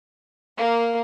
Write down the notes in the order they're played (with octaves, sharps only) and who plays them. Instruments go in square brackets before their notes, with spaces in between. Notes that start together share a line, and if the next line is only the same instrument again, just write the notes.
[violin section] A#3